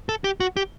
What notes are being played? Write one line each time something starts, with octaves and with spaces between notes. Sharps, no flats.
A4
G4
F#4
G4